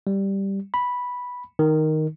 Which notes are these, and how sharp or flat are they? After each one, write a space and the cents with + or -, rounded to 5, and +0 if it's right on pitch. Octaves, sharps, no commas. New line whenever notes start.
G3 +0
B5 -5
D#3 +0